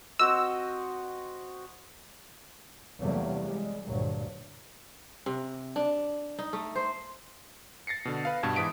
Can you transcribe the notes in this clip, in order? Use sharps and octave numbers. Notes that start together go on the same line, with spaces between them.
C4 F#4 D#5 E6
E2 C3 F#3 G3 A3 A#3
G3 G#3
D2 G2 A#2 F#3
C3
D4
D#4
A3
C5
A6 A#6 C7 C#7
B2 D3
B4 F5
G2 B2 A5 G#6
G#2 E3 D#6 B6 D7